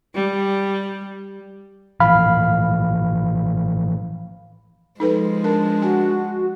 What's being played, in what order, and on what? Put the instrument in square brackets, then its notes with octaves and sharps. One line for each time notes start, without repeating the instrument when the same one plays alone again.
[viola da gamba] G3
[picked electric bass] A2 E3 F3 [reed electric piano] F5 B5 F6
[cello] F3 G#3 [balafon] D#4 A4 B4
[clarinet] D4 [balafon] A#4
[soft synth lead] F#4 [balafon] G#5